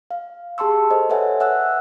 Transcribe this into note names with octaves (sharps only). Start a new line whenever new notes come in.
F5
G4 G#4 A5 C6 C#6 E6
A4 C5 D#5
A4 B4 C#5 E5 F#5 G#5
E5 F#5 E6 F#6